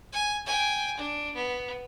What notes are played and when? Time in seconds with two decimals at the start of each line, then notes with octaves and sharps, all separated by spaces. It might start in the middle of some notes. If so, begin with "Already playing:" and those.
0.13 G#5
0.46 G5 G#5
0.97 D4
1.35 B3